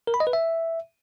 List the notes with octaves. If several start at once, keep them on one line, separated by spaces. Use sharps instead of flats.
A#4
B5
D#5
B4
E5